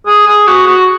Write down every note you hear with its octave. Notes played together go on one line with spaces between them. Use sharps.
G#4
G#4
F#4
F#4